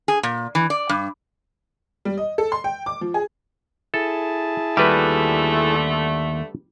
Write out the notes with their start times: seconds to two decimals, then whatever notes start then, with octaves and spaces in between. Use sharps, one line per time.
0.08 G#4
0.23 A#2
0.55 E3
0.70 D5
0.89 G2
2.05 G3
2.17 D#5
2.38 A4
2.52 C6
2.64 G5
2.86 D6
3.01 F3
3.14 G#4
3.94 E4 G#4 A4 A5
4.77 D#2 D3 G3 A3 F#4 G4 B4